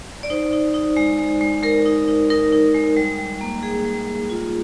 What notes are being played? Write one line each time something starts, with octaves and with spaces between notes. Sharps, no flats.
D5
D#4 C5
D#4
D#4
G#3
G#3
G#3
G#3 A#4
D#4
D#4
D#4 A#4
D#4
G#3
G3
G3
A#3
G3 G#4
G3
G3
F4